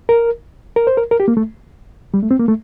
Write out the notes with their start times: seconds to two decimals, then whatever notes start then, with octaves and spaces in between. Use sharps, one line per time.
0.09 A#4
0.76 A#4
0.87 C5
0.97 A#4
1.11 A#4
1.20 G4
1.28 A#3
1.37 A3
2.14 G3
2.22 A3
2.31 C4
2.40 A#3
2.48 A3